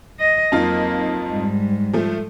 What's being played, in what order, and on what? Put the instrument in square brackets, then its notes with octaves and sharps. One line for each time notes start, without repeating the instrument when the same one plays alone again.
[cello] D#5
[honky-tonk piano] F2 D#4 F4 [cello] F#3 A#3
[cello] G#2 G3
[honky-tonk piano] F3 A3